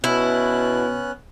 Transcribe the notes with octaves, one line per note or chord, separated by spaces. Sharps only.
B2 B3 C#4 E4 F#6